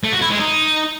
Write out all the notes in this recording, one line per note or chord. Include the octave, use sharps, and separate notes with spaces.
A3
F#4
E4
G#3
D#4